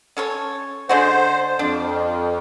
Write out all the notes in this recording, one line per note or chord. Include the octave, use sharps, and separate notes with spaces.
C#4 A4 C#5
D3 G#3 F#4 C5
F2 D4